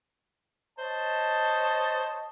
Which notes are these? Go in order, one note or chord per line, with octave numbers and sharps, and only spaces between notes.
C5 C#5 D#5 A5